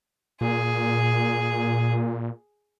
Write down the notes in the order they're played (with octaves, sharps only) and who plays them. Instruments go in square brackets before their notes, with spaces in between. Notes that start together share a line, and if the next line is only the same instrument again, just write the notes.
[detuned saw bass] A#2 [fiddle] G#4